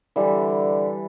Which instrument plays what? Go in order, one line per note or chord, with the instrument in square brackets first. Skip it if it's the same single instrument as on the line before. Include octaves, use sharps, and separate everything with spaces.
[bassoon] D3 [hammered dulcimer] E3 G3